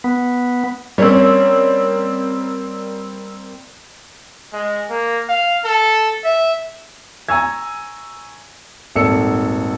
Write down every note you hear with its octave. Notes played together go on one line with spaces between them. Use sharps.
B3
G3 A#3 C4 C#4 C#5
G#3
A#3
F5
A4
E5
G#5 A#5 C#6 E6 G#6
D#1 G#1 A4 E6 C#7